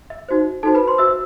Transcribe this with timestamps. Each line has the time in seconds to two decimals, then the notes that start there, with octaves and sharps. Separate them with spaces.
0.10 E5
0.29 D#4 F#4 C5
0.63 D#4 F#4 A4 C5 A5
0.75 B4 B5
0.87 C5 C6
0.98 F#4 C5 E5 E6